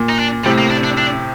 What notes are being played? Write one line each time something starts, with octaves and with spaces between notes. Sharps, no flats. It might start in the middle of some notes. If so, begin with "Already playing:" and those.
Already playing: A#2
D#4
D4
A2 C3 G3
A#3
D4
D4
D4